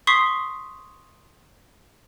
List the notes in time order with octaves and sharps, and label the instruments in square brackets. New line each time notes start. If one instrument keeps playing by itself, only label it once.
[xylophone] C6 C#6 D#6 B6 C7